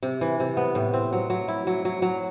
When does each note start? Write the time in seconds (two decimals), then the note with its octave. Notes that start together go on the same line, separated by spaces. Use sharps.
0.03 C3
0.21 E3
0.40 C3
0.57 B3
0.75 A2
0.94 C4
1.12 F#3
1.30 F#3
1.48 E4
1.67 F#3
1.85 F#3
2.02 F#3